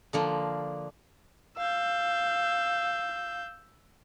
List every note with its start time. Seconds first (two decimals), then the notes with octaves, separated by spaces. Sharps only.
0.13 D3 F3 A#3
1.58 F5 E6 G6